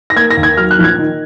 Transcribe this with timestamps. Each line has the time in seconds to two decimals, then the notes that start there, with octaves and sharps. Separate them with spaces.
0.10 A#6
0.16 A#3 G#6
0.31 A#6
0.37 D#2
0.43 G#6
0.57 F#3 F6
0.71 F#6
0.78 A#1
0.84 G#6
0.98 D#3